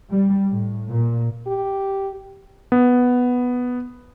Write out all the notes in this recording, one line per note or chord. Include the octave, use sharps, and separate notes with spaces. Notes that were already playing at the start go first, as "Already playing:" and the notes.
G3
A2
A#2
G4
B3